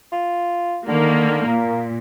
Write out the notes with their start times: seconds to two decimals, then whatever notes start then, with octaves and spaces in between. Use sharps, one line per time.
0.12 F4
0.88 D3 D#3 A#3
1.48 A#2 A#3